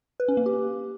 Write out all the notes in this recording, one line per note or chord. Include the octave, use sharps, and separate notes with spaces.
B4
C#4
A#3
G4